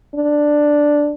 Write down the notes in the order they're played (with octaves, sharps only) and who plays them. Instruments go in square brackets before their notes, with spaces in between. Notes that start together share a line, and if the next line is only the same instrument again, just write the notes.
[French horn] D4